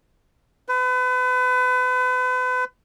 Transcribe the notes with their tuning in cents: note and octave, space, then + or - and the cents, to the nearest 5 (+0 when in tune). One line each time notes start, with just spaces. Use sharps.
B4 +35